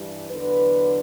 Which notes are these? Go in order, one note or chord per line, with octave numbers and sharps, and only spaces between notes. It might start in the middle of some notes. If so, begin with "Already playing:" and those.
Already playing: G2 E3 G3
E2 D3 F#3 B4